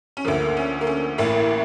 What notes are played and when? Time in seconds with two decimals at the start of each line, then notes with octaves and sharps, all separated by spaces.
0.17 C#4
0.25 D2 D3 F3 A#3
0.57 C#4
0.81 A#3
0.87 C#4
1.18 A1 A2 E3 A#3